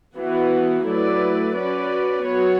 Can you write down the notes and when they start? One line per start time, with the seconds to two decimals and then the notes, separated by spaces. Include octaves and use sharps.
0.15 E3 B3 F#4
0.85 F#3 A3 E4 B4 D5
1.53 C#4 F#4 B4 D5
2.23 F#3 B3 F#4 C#5